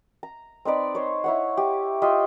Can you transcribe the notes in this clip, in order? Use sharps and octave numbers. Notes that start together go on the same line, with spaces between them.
A#5
C4 D#4 B4 D5
C5 C#5
E4 C#5 F#5
G4
F4 G4 D#5 E5